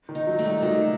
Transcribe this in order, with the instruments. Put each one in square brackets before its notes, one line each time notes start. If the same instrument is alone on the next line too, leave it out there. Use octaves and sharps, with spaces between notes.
[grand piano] D#3
[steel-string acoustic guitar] D#4
[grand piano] F#3
[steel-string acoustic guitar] A3
[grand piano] G3
[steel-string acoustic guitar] D#3 [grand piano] F#3